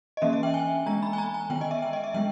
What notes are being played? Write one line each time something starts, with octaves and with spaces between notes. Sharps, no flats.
D#5
E3 A#3 C#4 E5
E5
G5
G#5
E3 G#3 B3 A#5
B5
G#5
A#5
G#5
D#3 G#3 B3 G5
D#5
E5
G5
D#5
E5
E3 G#3 B3 G5